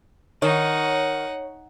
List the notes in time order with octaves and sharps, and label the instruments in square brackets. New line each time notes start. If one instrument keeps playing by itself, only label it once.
[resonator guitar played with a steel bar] D#3 [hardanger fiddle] D#4 F#5 [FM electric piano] C#5